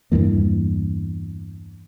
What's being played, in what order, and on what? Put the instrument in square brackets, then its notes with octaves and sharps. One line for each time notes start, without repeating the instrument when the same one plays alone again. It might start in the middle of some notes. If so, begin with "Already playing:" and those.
[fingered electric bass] E2 G2 E3 A#3